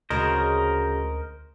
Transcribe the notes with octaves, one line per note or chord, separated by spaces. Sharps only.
D2 C#3 F#3 G#3 A#4 C5 D#5